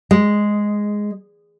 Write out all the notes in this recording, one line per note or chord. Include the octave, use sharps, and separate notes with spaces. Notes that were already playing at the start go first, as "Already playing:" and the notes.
G#3